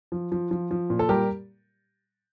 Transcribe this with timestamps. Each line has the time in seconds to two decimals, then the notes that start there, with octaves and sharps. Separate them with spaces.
0.12 F3
0.32 F3
0.51 F3
0.71 F3
0.90 A#2
0.99 A4
1.09 G3 G4 A#4